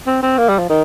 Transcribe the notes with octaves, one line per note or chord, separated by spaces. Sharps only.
C4
C4
A#3
G3
F3
D#3